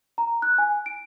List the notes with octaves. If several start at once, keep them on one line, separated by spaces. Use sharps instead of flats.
A#5
F#6
G#5
D7